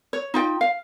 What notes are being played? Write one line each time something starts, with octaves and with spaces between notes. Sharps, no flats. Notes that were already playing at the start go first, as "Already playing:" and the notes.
C#5
D#4 F4 G5
F5